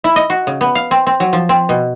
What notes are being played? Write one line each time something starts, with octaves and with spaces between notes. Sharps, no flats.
E4
D#5
F#4
C#3
B3
F5
C4
C4
F#3
F3
C4
B2